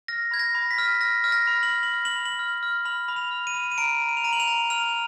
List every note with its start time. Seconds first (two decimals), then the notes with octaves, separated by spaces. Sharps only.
0.08 F6 A#6
0.31 B5 G#6
0.39 A#6
0.55 B5
0.71 B6
0.78 F6
1.01 F6 A#6
1.24 F6
1.32 A#6
1.47 B5
1.63 F#7
1.70 F6
1.83 F#7
1.94 F6
2.05 F#7
2.16 B5
2.25 F#7
2.39 F6
2.63 F6
2.85 B5 F#7
3.08 B5
3.16 F7
3.31 F6
3.47 D#7
3.54 B5
3.71 D#7
3.78 A#5 D7
4.01 A#5
4.09 D#7
4.17 F7
4.24 A#5 D#7
4.33 F#7
4.40 F7
4.47 A#5
4.70 F6 F7